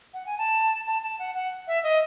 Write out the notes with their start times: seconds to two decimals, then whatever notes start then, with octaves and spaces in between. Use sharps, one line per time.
0.14 F#5
0.26 G#5
0.38 A5
0.87 A5
1.02 A5
1.19 F#5
1.35 F#5
1.67 E5
1.83 D#5